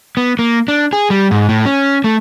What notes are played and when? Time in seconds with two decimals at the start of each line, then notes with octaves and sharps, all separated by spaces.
0.17 B3
0.39 A#3
0.68 D4
0.93 G#4
1.10 G3
1.31 G#2
1.49 A2
1.66 C#4
2.04 A3